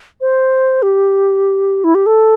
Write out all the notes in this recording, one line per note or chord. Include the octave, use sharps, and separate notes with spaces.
C5
G4
E4
G4
A4